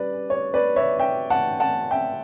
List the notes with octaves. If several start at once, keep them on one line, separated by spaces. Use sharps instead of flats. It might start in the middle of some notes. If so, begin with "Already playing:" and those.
Already playing: G3 C#4 B4 D5
C#5
B4 D5
C#5 E5
E5 G5
F#5 A5
F#5 A5
E5 G5